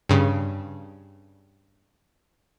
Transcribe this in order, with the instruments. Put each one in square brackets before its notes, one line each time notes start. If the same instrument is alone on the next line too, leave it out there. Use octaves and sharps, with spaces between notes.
[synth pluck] G2 C#3